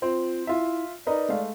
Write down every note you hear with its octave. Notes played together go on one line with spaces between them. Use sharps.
C4 F4
E4 F4 E5
D#4 A#4 B4 D5
G#3 A3 F5